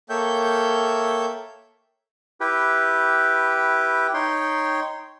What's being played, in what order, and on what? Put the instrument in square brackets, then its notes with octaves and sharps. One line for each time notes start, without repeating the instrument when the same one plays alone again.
[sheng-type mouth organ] A#3 A4 C#5 E5 G5 G6
[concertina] E4 G4 B4 G5
D#4 C#5 G5 C6